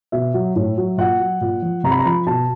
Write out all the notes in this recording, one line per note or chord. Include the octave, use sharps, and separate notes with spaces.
B2 E5
F#3
A2
F#3
A#2 F#5
F#3
A#2
F3
C3 A#5
B5
A#5
F3 B5
B2 A5